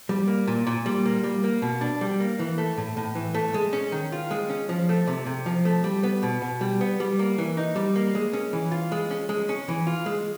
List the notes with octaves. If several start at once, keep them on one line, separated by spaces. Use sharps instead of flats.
G3
A#3
A#2
A#2
G3
A#3
G3
A#3
B2
D4
G3
A#3
E3
A3
A2
A2
E3
A3
G#3
C#4
D#3
F4
G#3
C#4
F3
A3
C3
C3
F3
A3
G3
B3
B2
B2
G3
B3
G3
A#3
E3
D#4
G3
A#3
G#3
C#4
E3
F4
G#3
C#4
G#3
C#4
E3
F4
G#3